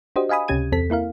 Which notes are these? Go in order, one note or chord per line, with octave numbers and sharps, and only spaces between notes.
D4 F#4 G4 C5 D#5
D#5 F5 G#5 B5 D#6
C#2 C3 C#4 G4 G#6 D#7
E2 C4 A4 B6
A#3 E4 A#4 F5